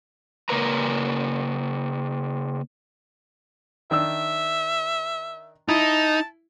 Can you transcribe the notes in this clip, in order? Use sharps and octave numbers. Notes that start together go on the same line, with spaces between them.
C#3 A#3 A#4 B4 A#5
D#3 D4 E5 E6
D#4 E4 A5